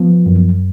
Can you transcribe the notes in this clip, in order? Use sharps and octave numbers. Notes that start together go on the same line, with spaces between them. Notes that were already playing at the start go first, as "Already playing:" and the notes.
Already playing: F3 B3
F#2